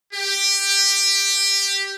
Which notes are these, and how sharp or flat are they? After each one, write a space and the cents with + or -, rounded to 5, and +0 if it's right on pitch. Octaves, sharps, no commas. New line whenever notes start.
G4 +10